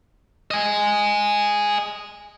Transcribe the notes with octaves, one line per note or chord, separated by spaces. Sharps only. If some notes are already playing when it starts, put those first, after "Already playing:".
D#5 G#5